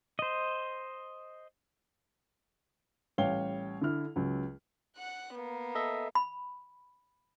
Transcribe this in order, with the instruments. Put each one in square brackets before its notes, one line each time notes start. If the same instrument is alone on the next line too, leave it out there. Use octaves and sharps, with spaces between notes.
[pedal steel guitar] C5 D#5
[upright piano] A1 G3 C#5 F5 G5 G7
D3 E4 F6
C#2 F#3
[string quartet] F#5 F#6
A#3 B3
[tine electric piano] A4 D#5 E5
[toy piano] B5